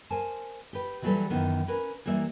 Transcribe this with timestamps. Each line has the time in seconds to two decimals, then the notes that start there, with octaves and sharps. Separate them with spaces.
0.10 A#4 C5 G#5 A5
0.73 G4 B4
1.02 E3 F#3 G3 F4 A4 B4
1.30 F#2 D#3 E3 B3
1.68 C#4 A#4 B4
2.06 E3 G3 A#3 A#4 E5